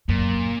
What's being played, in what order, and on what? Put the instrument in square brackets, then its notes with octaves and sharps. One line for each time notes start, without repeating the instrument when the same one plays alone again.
[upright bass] F#2 [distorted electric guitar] A#2